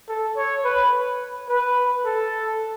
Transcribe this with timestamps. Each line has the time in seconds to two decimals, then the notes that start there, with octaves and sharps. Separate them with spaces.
0.09 A4
0.37 C#5
0.65 B4
1.49 B4
2.05 A4